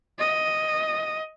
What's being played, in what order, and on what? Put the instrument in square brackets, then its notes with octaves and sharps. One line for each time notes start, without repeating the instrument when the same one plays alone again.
[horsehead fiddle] D#5